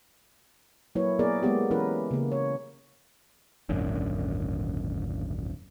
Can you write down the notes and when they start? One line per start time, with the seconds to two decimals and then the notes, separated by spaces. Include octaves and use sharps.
0.95 F#3 A#3 E4 B4 C#5
1.19 A#3 B3 G#4 A#4 D5
1.43 G#3 A#3 B3 G4
1.71 E3 C#4 E4 G4 A#4 B4
2.11 C#3 A#3
2.32 C#5
3.69 D#1 G#1 F#2 D3